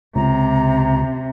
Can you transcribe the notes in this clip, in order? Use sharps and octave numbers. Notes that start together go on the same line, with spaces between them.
C#2 C3 A#5